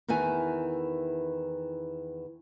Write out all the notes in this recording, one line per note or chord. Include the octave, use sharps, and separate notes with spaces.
E2 D#3 E3 E4 G#5